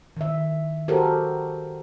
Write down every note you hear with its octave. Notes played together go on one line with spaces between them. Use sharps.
D#3 E5
F#4 G4 A4 A#4 C5